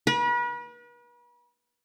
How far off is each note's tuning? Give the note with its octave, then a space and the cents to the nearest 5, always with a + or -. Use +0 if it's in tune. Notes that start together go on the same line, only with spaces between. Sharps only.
B4 -40